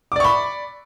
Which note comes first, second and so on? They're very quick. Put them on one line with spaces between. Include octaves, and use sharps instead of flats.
D6 D5 C#6 B5